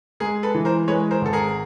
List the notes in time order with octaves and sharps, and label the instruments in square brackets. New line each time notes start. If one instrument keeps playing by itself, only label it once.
[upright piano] G#3 [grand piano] G#4 A#4
[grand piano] A4 B4
[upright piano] E3
[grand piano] A#4 C5
[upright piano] G#3 [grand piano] B4 C#5
[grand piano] A#4 C5
[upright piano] G#1 [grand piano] A4
[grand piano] G#4 A#4